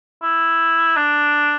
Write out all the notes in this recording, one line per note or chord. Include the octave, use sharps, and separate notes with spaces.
E4
D4